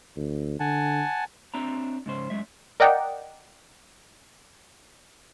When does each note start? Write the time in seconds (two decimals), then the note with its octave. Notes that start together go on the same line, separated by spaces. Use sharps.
0.17 D2
0.60 D3 F#5 G#5 A5
1.54 C4 D4 E5 A#5
2.06 G#2 C#3 C5
2.30 F#2 G#3 E5
2.80 A#4 D5 D#5 F#5 G5